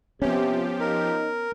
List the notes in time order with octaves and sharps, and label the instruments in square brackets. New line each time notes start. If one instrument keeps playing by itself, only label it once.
[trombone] C3 [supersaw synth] F3 G4 [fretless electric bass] B3 C#4
[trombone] D#4 [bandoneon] A#4